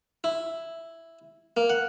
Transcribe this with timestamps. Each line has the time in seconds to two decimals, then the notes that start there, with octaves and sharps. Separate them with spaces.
0.24 E4
1.57 A#3
1.70 F#5